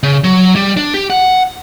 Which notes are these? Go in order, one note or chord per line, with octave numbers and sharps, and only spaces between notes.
C#3
F#3
G3
D4
G4
F#5